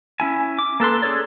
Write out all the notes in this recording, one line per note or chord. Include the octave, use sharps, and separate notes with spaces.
C#4 E4 G#5
D6
A#3 A4 B4 C6
C#4 G#4 A4 C#5 D5